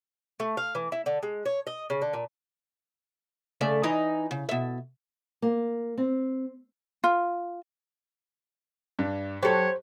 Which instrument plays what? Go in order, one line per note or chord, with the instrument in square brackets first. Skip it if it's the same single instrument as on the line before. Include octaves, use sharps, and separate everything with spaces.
[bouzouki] A3
F5
E3
E4
D3
G#3
C#5
D#5
C#3
D3
A#2
[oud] C#3 A3 D5
E3 D#4
C#3
B2 E5
[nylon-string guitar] A#3
C4
[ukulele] F4
[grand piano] G2 D4
[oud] F#3 A4 [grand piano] G4 [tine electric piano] C5 [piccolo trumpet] C#5